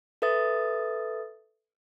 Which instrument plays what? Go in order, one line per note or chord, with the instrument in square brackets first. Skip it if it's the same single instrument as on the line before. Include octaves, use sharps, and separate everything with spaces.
[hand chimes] A4 B4 E5 D#6 A6